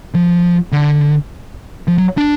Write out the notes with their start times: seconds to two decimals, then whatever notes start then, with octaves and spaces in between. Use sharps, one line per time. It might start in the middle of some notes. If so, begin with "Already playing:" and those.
0.14 F3
0.72 D3
1.88 F3
1.98 F#3
2.18 D4